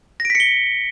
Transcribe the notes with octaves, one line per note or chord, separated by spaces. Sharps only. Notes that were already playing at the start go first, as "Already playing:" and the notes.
A#6
D7
B6
C#7
G7